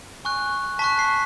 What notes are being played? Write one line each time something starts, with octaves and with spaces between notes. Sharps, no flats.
G#5 C#6 F#6
A5 C#6 F#6 B6
C7